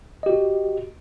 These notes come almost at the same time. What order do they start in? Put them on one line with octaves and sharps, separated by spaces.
D#5 G4 F#4